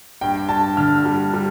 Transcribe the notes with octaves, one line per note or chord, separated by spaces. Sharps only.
G2 G5
G2 A5
D3 F6
G3
G3